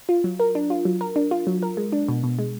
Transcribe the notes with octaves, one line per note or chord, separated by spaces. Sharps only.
F4
F#3
A#4
D4
F4
F#3
A#4
D4
F4
F#3
A#4
G#3
D4
B2
B2
G#3